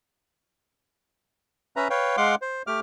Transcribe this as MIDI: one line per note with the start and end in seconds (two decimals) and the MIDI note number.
1.76 1.88 61
1.76 1.88 71
1.76 1.88 76
1.76 1.88 82
1.90 2.16 71
1.90 2.16 73
1.90 2.16 77
1.90 2.16 79
2.17 2.35 56
2.17 2.35 77
2.17 2.35 78
2.17 2.35 84
2.17 2.35 86
2.42 2.62 72
2.67 2.80 57
2.67 2.80 67
2.67 2.80 86
2.67 2.80 89